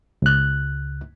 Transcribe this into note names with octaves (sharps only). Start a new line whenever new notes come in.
C#2 F#6